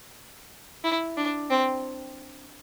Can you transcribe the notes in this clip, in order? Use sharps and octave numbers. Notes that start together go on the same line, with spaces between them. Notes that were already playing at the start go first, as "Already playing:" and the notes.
E4
D4
C4